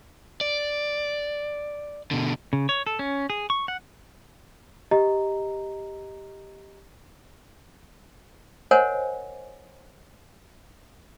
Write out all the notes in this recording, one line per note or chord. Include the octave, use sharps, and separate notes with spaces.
D5
B2 D3
C#3
C#5
A4
C#4
G#4
C#6
F#5
G4 D#5 A#5
A#4 C5 C#5 D#5 F#5 G#5